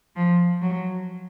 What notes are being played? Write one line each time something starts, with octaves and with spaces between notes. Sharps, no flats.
F3
F#3